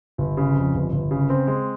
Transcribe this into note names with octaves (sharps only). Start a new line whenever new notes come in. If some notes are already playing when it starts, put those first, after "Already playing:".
G1
C#3
F2
G1
G1
C#3
C4
G#3